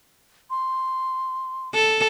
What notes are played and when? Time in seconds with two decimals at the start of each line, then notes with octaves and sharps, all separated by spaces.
0.50 C6
1.74 A4